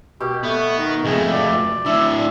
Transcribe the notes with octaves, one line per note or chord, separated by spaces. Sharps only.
B2 G4
A3 B3
D#3
F2 G#3 A3
D5
A2 D3 E5